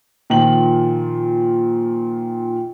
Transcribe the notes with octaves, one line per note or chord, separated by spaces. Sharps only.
A#2 D#3 F3 F#7